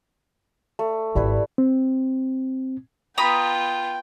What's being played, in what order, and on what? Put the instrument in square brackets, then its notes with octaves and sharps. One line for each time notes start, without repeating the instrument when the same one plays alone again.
[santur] A3
[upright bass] G#1 [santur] G3 E4 B4
[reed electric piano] C4
[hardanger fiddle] B3 F4 [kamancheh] G5 [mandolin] A#5 B5 D#6